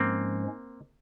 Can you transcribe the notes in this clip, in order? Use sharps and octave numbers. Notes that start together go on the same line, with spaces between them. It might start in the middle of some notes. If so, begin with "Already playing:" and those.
Already playing: G#2 F3 G#3 A#3 C4 C#4